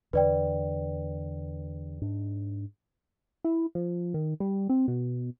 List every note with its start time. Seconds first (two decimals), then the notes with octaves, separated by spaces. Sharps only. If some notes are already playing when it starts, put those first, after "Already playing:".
0.13 E2 D3 B4 D5 G5
2.02 G#2 D4
3.44 E4
3.75 F3
4.14 D#3
4.40 G3
4.69 C4
4.88 B2